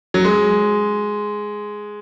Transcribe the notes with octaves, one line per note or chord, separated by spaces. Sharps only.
F#3
G#3